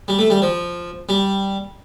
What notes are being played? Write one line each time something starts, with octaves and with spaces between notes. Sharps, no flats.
G3
A3
G3
F3
G3